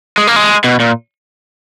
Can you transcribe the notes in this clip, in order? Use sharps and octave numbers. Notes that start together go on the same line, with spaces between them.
G#3
A#3
G#3
B2
A#2